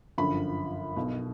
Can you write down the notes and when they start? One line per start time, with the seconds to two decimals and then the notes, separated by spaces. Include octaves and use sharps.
0.18 G1 F#2 D3 F3 B5
0.96 B1 B2